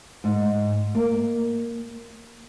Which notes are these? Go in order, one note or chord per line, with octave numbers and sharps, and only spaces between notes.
G#2
A#3